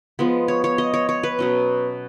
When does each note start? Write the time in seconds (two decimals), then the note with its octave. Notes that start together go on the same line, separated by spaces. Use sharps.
0.19 F3 G#3 B3
0.48 C#5
0.64 C#5
0.78 D#5
0.94 C#5
1.09 C#5
1.23 B4
1.39 B2 F#3 C#4